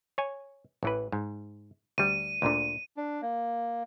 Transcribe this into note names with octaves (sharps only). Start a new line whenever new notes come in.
C#5 G#5
A1 E3 B4
G#2
D2 G3 D#7
D2 A#2 D3
D4
A#3